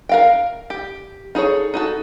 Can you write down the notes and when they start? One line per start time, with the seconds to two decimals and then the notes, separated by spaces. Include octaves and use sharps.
0.09 A#4 F5 G5
0.70 G4
1.35 D#4 G#4 A4 C#5
1.74 D#4 F#4 A4